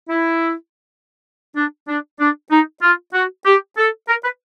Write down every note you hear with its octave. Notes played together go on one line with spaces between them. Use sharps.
E4
D4
D4
D4
D#4
F4
F#4
G4
A4
A#4
B4